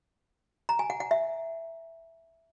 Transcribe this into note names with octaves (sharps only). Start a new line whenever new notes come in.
A#5
G#5
F#5
F#5
E5